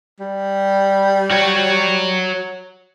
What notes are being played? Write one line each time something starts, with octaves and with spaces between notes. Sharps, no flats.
G3
F#4 C#5